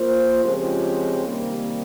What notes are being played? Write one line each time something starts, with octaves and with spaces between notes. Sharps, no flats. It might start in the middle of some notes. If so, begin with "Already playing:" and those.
Already playing: A#3 F4 C5
C#3 F3 G#3 C4 G4
C3 D#3 G3 A#3